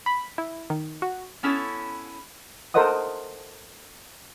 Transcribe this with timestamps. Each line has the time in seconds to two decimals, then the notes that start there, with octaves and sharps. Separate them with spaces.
0.06 B5
0.38 E4
0.70 D#3
1.02 F#4
1.43 B3 C#4 E4 A4 C#5
2.74 A4 A#4 C5 D#5 F#5 D#6